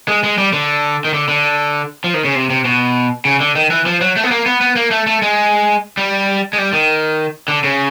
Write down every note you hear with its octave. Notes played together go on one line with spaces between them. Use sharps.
G#3
G#3
G3
D3
D#3
D3
D3
F3
D#3
C#3
C3
C3
B2
C#3
D3
D#3
E3
F3
F#3
A3
B3
A#3
B3
B3
A#3
A3
A3
G#3
G3
G#3
G3
D#3
D3
C#3